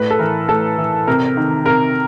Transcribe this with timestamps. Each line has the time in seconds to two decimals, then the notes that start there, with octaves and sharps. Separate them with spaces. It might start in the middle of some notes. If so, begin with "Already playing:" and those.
Already playing: A2 B4
0.10 A4
0.19 E3 A#4
0.49 A2 A4
0.78 E3
1.07 C3 A#4
1.37 D#3
1.66 C3 A#4